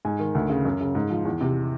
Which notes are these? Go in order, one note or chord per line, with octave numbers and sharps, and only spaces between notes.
G#2 G#5
D#3
D2
C#3
F#2
C#3
G#2
F3
E2
C3